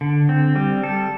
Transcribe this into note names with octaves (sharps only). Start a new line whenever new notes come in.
D3
C4
G3
A4